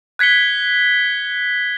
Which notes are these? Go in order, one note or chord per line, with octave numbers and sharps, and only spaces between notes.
F#6 G#6 B6 C#7 G7